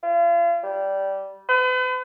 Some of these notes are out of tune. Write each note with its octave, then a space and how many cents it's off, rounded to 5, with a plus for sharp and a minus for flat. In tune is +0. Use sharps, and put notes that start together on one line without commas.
F4 -40
G3 -15
B4 +45